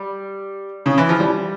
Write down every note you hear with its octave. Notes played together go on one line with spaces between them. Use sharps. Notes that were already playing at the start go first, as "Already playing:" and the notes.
Already playing: G3
C#3
E3
F3
G3